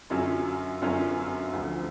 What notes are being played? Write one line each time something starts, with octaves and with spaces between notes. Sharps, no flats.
F#2 D3 F#3 C#4 F4
F#2 D3 F#3 C#4 F4
D2 D3 F3